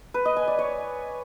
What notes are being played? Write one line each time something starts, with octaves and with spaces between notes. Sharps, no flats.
B4
D#5
G#5
D5
C#5